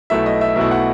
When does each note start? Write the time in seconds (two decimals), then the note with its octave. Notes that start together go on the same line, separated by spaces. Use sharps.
0.10 B1 B2 A3 E4 E5
0.26 D#5
0.41 E5
0.56 B1 B2 A3 E4 E5
0.71 F#5